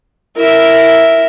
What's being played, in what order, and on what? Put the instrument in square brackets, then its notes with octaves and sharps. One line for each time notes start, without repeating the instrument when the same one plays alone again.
[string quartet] E4 A#4 E5